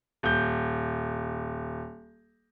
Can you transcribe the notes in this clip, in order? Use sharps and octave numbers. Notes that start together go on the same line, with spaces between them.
D#1 G6